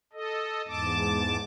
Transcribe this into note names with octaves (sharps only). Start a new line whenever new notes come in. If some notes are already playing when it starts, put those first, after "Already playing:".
A4 D#5
E2 G#2 A5 D6